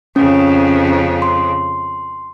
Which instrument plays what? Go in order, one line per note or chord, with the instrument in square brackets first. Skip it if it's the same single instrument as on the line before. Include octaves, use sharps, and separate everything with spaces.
[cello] F2 C#3 [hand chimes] C#4
[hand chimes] C6